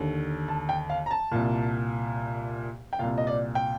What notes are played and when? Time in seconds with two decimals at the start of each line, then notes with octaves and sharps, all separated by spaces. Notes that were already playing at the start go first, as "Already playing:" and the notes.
Already playing: D#2 D3
0.48 A5
0.69 G5
0.90 F5
1.06 A#5
1.11 A5
1.32 C2 A#2
2.93 G5
2.99 C2 A#2 F5
3.18 D#5
3.27 D5
3.55 G5